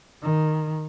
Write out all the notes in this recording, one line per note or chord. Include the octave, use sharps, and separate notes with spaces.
D#3